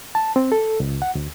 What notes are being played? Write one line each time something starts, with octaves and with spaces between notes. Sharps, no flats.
A5
C4
A4
C#2
F#5
D2